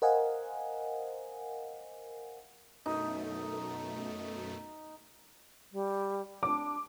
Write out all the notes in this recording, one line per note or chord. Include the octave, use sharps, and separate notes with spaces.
A#4 C5 D#5 F5 F#5 G#5
F#2 B2 A3 D#4
G3
D4 D6